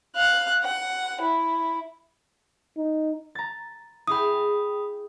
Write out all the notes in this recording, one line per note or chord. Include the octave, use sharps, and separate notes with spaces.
F5 F#6
F#5
E4
D#4
A#5 A6
E4 G#4 G5 B5 D#6